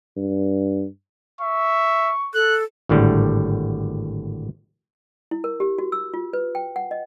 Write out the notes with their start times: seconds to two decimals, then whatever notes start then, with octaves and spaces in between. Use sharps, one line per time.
0.17 G2
1.41 E5 C#6
2.34 A4 F#6
2.89 G#1 A2 D3 G3
5.31 E4
5.44 A#4
5.60 G4
5.79 F#4
5.92 E6
6.14 F4
6.33 B4
6.55 G5
6.76 F#5
6.91 D#5